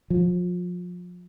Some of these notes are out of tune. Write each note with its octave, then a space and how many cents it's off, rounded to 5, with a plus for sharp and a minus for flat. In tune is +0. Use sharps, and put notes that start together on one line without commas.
F3 +30